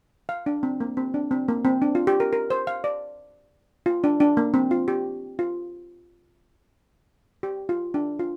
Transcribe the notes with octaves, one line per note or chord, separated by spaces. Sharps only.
F5
D4
C4
A#3
C4
D4
C4
A#3
C4
D4
F4
G4
A#4
A#4
C5
F5
D5
F4
D4
D4
A#3
C4
F4
G4
F4
G4
F4
D4
F4